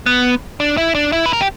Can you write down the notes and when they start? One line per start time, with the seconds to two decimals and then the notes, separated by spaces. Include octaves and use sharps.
0.06 B3
0.60 D4
0.77 E4
0.95 D4
1.12 E4
1.26 B4
1.33 A#4
1.41 G4